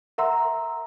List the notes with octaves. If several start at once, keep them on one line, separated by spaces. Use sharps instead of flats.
A#4 E5 F#5 A#5 C6 E6